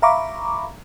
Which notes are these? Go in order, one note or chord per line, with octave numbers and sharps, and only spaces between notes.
E5 F5 A#5 B5 C#6 D6